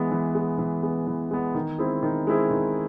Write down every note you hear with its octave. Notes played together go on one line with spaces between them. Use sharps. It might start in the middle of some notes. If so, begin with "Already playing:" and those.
Already playing: E3 G#3 B3
E3
G#3 B3
E3
G#3 B3
E3
G#3 B3
D#3
G#3 C4 E4 G#4
D#3
G#3 C4 E4 G#4
D#3